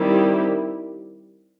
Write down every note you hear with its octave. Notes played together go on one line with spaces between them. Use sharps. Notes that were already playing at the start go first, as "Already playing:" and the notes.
Already playing: D#3 G3 C4 E4 G4